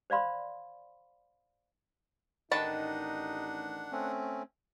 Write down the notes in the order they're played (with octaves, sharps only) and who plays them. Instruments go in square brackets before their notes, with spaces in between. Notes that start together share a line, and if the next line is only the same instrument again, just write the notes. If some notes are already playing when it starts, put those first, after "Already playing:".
[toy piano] C5 D5 F5 B5 C6
[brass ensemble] A1 D#4 [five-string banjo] D#3 A5 B5 [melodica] D4 F#5
[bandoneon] A3 C4 C#4